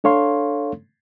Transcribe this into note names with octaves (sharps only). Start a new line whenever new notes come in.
D4 A4 C#5 F5 C6